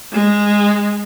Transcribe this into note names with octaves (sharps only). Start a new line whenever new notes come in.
G#3